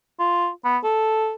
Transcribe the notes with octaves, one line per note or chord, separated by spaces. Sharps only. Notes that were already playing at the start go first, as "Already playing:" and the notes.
F4
B3
A4